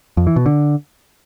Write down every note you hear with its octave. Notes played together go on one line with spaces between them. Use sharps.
F2
E3
B2
D3